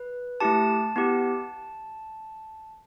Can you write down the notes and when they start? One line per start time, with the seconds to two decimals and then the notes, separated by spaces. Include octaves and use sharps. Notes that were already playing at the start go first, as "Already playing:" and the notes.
Already playing: B4
0.40 A3 E4 G4 A5
0.96 B3 E4 G4